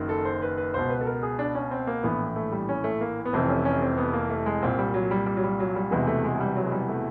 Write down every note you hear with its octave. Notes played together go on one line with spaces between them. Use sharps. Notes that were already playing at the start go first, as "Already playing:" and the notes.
Already playing: F#1 F#2 D#3
A4
C5
B4
B4
C#2 B2 C5
B4
A4
A#4
G#4
D4
C#4
C4
A#3
A#1 A2 E3 B3
A3
G3
C#4
A3
A#3
B3
F1 F2 C3 E3 C4
C#4
C#4
C4
B3
A#3
A3
G#3
C2 A#2 C4
G3
F#3
G3
G3
F#3
G3
F#3
G3
E1 E2 C3 E3 G#3
A3
G#3
G#3
G3
F#3
G#3
G3
A3